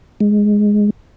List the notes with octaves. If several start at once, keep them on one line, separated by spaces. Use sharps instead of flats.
G#3